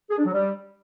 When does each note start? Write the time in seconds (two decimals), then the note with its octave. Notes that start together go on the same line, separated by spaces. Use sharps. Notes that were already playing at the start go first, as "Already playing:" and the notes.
0.10 G#4
0.18 D4
0.25 F#3
0.33 G3